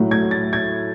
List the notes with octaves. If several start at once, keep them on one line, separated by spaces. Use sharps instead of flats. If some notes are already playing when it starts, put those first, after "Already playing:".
Already playing: A2 F#3
G#6
A6
G#6